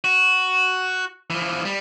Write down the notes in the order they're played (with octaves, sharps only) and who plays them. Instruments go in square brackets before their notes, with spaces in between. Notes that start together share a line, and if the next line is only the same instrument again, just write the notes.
[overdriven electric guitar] F#4
E3 F3
G3